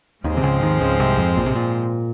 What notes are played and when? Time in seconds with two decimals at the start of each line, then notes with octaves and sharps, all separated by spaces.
0.24 D#2 G#2 D#3 F3 G#3 C4
0.37 C3
0.43 C#2 C#3
0.62 D#2 D#3
0.81 C#2 C#3
0.99 C2 C3
1.18 F2
1.37 A#1 A#2
1.46 C3
1.55 A#2